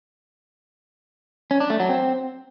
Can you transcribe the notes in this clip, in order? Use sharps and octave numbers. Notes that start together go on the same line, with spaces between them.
C#4
D4
A3
F#3
C4